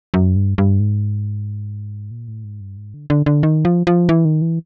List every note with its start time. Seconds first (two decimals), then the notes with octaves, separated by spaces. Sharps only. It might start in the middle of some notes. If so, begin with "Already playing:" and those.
0.14 F#2
0.36 G2
0.58 G2
0.80 G#2
2.11 A#2
2.28 A2
2.44 G#2
2.61 G2
2.77 G#2
2.94 D3
3.10 D3
3.26 D3
3.43 D#3
3.65 F3
3.87 F3
4.09 E3
4.25 D#3
4.42 E3